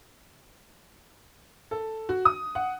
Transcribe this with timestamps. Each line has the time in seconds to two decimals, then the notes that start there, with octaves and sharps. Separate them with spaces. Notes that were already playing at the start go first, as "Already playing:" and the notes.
1.71 A4
2.09 F#4
2.25 D#6
2.55 F#5